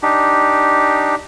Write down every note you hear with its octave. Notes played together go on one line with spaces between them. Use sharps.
D4 D#4 G4